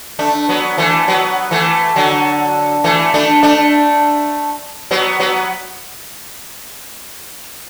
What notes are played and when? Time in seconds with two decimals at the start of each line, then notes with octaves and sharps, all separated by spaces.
0.19 A3 D4
0.49 F#3 B3
0.78 E3 A3
1.08 F#3 B3
1.51 E3 A3
1.96 D3 F#3
2.84 E3 A3
3.14 A3 D4
3.43 A3 D4
4.91 F#3 B3
5.20 F#3 B3